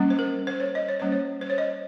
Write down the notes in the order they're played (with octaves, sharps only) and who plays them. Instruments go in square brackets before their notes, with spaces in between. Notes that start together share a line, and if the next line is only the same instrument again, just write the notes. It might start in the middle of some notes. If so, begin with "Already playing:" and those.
Already playing: [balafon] G3 A#3 C#4
C5
A#4
C5
C#5
D#5
C#5
G3 A#3 C#4 C5
C#5
C5
C#5
D#5